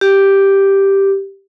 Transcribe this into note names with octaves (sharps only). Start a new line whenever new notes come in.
G4